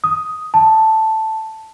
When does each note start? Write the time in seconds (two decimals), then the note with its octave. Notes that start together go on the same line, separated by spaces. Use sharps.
0.04 D#6
0.54 A5